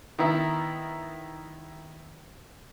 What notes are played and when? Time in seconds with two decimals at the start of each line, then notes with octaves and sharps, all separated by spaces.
0.19 D#3 B3 E4